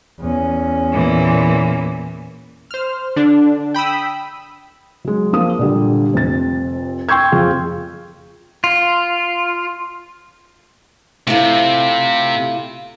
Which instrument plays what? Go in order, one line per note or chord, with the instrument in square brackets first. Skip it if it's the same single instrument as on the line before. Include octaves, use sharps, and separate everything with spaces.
[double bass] E2 C#4
[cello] A#2 E3
[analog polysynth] C5 F6
D3 D4
G5 B5 D#6 E6
[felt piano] F#3 G#3
F3 A#3 D#6
A#2 D3 G3
F1 F2 A6
G5 C6 C#6 E6 G6 G#6
F2 F4 G#4
[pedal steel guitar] F4
[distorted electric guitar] C3 [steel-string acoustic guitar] A3 E4 F4